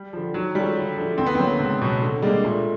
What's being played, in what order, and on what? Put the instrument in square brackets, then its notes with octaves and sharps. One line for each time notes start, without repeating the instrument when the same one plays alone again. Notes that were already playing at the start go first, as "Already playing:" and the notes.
Already playing: [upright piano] G3
[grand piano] D3 F3
[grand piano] D#3 [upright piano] F#3
[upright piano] G3 [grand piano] G#3 C#4 F4 A4
[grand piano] D3
F3 A3 D4
[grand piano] D2 [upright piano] C4
[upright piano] B3
[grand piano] D3 F#3 A#3 [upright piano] C4
[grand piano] C#2
B2 F#3
D3
[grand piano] G3 A#3 D4 [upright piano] G#3
[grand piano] A#2 [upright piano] A3